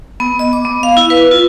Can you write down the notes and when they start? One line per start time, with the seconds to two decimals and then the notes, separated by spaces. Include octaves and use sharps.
0.20 B3
0.39 D#5
0.53 D6
0.65 B3
0.83 F5
0.97 E4
1.10 B4
1.31 F4